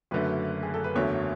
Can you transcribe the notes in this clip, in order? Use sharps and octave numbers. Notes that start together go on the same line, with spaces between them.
F#1 F#2 D3 A3 B4
G#4
A4
B4
F#1 E2 D3 F#3 A3 C#5